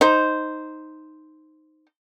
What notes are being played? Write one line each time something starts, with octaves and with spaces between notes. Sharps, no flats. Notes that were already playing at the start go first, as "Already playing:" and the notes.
D#4 C5